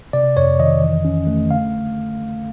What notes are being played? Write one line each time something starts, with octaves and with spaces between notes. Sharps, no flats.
C3 D5
F2 C#5
D#3 D#5
E3
C#4
A3
D3 F5